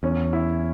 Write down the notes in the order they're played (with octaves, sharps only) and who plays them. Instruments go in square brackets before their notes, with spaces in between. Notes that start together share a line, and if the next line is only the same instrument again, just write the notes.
[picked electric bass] E2 [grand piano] C#4
[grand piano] E4